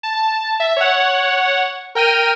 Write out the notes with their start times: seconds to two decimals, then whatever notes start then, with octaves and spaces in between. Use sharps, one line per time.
0.03 A5
0.60 E5
0.77 C#5 F#5
1.95 A#4 G5 F6 D#7